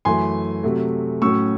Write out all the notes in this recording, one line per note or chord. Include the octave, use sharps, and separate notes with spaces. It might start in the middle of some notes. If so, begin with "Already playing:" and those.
F#2 E3 A3 G#5 C6
C3 F#3 A3
A2 F#3 C#4 C#6 E6